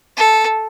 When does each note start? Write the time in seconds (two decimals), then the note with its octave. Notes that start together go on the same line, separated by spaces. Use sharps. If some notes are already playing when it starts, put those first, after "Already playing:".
0.17 A4